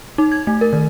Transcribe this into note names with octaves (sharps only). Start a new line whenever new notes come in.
D#4
G#6
A3
A#4
D#3